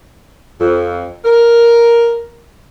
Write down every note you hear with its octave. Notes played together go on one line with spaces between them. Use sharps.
F2
A#4